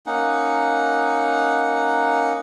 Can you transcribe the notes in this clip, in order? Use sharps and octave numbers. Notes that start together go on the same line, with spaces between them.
A#3 C#4 D#4 F#5